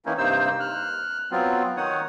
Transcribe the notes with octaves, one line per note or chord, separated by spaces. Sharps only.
D#3 E3 A#3 C#4 D#4 E4
G2 C3 A#3 D#4 C5 E6
F6 F#6
F#3 B3 C4 F4
D#3 D#4 C#5 F#5 D#6